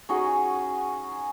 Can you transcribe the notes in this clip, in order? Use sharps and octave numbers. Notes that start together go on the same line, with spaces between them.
C#4 D#4 F#4 G#4